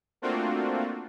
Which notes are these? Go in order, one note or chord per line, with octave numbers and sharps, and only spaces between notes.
A3 A#3 C4 D4 F4 F#4